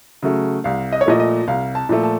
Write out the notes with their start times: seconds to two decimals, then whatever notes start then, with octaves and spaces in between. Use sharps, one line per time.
0.22 C#3 F#3 A3
0.64 C2 F5
0.92 D#5
1.01 C#5
1.06 A#2 F3 A3 D#5
1.20 D#5
1.48 C2 F5
1.75 A5
1.89 A#2 F3 A3
2.03 A5